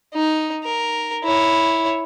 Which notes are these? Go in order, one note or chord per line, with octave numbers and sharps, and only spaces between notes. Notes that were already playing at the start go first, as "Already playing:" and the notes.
D#4
A#4
E4 C#5